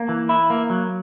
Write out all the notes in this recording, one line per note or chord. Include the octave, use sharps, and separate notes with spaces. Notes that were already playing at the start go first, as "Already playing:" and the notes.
Already playing: A#3
E3
E4
A#3
F#3